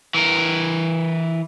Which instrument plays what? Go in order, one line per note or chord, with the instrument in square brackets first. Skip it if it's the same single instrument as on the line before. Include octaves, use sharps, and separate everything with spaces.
[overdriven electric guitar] E3 A#4